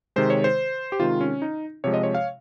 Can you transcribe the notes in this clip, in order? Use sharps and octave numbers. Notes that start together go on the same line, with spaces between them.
C3 D#3 G#3 C5
C#5
C5
G4
C3 D#3 G#3 F4
C#4
D#4
C3 F3 G#3 C#5
D#5
C#5
F5